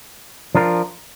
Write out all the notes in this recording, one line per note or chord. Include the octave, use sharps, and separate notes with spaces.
F3 D4 F4 A#4